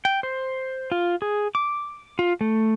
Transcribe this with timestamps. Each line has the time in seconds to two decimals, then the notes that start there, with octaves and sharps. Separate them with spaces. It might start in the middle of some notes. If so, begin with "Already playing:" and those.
0.05 G5
0.23 C5
0.92 F4
1.22 G#4
1.55 D6
2.19 F4
2.41 A3